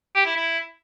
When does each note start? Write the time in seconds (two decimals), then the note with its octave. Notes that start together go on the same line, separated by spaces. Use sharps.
0.15 G4
0.26 E4
0.36 E4